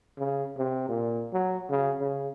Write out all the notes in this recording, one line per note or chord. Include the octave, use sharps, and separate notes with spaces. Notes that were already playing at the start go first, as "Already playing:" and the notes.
C#3
C3
A#2
F#3
C#3
C#3